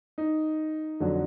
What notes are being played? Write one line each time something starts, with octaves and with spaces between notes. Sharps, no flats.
D#4
F2 D3 F#3 D4